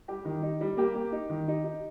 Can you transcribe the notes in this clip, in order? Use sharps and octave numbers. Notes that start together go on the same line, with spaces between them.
G3 G4
D#3
D#4
G3
A#3 G4
A#3
D#4
D#3
D#4
D#4